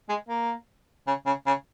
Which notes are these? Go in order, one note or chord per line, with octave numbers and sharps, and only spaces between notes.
G#3
A#3
C#3
C#3
C#3